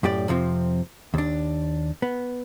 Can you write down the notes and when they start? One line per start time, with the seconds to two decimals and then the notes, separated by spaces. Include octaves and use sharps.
0.03 F#2 A2 G4 D5
0.28 F2 C3 F3 C4
1.14 D#2 D4
2.02 B3